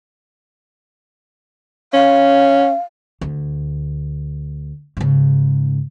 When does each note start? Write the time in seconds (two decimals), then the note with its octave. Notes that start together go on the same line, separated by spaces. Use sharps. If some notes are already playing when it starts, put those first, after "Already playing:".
1.93 C#4 F5
3.21 D2
4.97 G#2 C#3